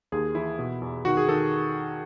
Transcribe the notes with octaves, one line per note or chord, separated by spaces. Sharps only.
D#2 G#4
E3 E4
B2
E2
D#3 F#4
G#4
D#3 A4